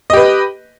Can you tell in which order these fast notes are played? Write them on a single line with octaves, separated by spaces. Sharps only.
D#5 G4 B4